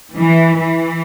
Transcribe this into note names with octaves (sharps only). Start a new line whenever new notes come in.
E3
E3